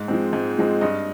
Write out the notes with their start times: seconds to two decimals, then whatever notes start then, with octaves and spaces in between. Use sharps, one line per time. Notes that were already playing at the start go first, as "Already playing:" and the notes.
Already playing: G#2
0.08 F3 G#3 C4
0.33 G#2
0.58 F3 G#3 C4
0.81 G2 D#5